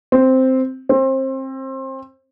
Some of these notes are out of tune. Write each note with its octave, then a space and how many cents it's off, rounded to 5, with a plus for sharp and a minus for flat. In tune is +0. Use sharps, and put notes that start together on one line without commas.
C4 -5
C4 +25